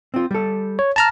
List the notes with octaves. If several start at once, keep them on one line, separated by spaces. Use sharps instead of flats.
C4 F4
G3 A4
C#5
A5 A#5 F6